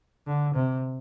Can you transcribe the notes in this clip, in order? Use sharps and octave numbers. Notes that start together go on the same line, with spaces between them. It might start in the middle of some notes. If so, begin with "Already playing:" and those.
D3
C3